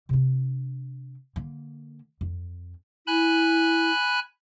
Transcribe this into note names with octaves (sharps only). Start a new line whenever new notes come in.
C3 D4
D3 A#3
F2
E4 G#5 B5 F#6